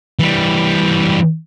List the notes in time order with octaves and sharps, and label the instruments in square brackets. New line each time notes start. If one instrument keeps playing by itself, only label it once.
[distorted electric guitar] E3 G3